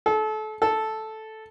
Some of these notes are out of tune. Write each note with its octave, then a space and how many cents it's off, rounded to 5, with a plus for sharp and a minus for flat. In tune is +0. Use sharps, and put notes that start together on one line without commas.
A4 -30
A4 -5